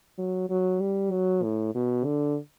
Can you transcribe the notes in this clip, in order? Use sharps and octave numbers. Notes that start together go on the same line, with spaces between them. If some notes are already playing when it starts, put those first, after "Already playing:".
F#3
F#3
G3
F#3
A2
B2
D3